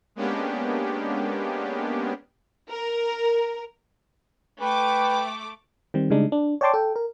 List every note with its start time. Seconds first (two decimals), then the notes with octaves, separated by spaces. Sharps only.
0.16 G#3 A#3 B3 C#4 D4 G4
2.70 A#4
4.61 A3 B4 G5 D6
5.94 D#3 G3 C4
6.10 C#3 G3 G#3 D4 D#4
6.32 D4
6.61 C#5 D5 G5 A5 C6 D6
6.74 A4 G5
6.96 A#4